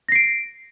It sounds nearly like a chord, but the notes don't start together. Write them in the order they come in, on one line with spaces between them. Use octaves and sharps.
A#6 C7 D7